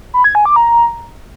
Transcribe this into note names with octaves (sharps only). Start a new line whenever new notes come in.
B5
G#6
G#5
D6
A#5